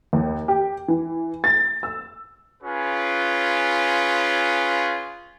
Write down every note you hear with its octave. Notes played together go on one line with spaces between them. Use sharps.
D#2
G4
E3
A6
E6
C#4 F4 G#4 B4